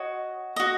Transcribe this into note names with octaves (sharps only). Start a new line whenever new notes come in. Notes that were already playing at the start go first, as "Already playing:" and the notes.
Already playing: F#4 C#5 D#5
F#4 D#5